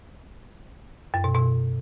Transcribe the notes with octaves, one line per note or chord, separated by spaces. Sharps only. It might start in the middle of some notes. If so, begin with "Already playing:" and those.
F#2
B2
B2